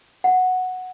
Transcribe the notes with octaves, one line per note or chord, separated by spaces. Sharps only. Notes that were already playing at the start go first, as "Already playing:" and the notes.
F#5